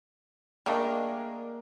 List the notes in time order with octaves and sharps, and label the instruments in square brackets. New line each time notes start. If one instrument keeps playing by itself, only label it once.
[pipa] G3 A3 D4 [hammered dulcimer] A#3 [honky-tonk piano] G#4 A#4 D#5